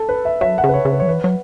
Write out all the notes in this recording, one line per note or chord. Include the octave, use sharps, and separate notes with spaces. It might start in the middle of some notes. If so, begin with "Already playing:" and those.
Already playing: A4
B4
E5
F#3 E5
F#5
C#3
B4
C#5
C#3
B4
F#3 C#5
E3 B4
F#3